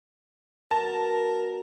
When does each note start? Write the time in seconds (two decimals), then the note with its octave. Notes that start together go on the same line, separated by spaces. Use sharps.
0.71 B2 F#3 A#4 A5